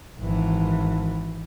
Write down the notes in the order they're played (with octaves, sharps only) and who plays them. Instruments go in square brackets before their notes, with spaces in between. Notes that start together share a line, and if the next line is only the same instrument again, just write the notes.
[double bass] G#1 E3